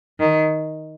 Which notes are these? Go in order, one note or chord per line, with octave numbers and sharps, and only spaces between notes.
D#3